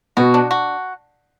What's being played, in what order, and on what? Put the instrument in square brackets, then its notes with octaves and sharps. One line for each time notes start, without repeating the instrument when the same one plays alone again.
[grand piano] B2 [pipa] F#4
[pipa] D4
F#4